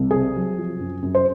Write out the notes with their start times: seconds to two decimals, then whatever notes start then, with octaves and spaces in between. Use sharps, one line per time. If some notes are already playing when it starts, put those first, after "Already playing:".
Already playing: C2
0.11 C3 G#4
0.36 F#3
0.58 F3
0.80 F#2
1.02 F#2
1.15 C5